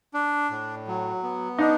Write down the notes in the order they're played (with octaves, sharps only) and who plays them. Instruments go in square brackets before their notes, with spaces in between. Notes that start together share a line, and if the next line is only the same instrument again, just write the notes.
[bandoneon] D4
A2
F#3
B3
[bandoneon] D4 [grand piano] D#4